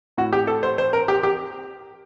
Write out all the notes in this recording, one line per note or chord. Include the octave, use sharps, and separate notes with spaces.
A2 F#4
G4
A4
C5
C5
A#4
G4
G4